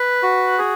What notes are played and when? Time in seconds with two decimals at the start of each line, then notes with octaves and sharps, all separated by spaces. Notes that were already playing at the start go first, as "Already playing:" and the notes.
Already playing: B4
0.23 F#4
0.58 G#4